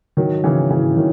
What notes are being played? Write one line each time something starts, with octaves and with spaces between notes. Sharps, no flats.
D#3 F#3
C#3 E3
C#3 E3
D#3 F#3